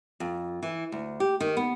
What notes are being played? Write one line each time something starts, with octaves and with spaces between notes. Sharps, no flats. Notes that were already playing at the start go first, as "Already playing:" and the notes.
F2
E3
D2
G4
D#3
B3